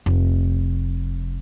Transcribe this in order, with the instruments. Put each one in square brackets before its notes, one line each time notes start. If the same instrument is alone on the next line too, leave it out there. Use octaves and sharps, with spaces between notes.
[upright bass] F1